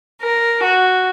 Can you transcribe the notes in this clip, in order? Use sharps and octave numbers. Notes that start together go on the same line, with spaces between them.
A#4
F#4